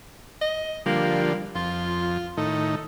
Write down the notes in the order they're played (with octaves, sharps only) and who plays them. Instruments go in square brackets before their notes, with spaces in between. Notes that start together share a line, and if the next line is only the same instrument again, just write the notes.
[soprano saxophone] D#5
[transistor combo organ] D3 F3 G3 [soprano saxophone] A#3
[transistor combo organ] F2 [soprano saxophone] F4
[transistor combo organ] A2 D#3 D#4 [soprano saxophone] A4